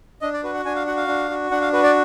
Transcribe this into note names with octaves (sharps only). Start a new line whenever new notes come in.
D4 D#5
D5
F#4 B4
F#5
D4 G#5
F5
F#4 F#5
F5
D4
F#4
D4 F#5
F5
F#4 B4
D5